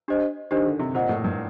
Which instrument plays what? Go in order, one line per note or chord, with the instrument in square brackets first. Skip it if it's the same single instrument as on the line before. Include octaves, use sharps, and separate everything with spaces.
[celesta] D4 G4 C5 D#5
[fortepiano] D#3 [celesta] D4 G4 C5 D#5
[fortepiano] D3
C3
[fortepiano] A#2 [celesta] C5 D#5 F#5
[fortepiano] A2
G2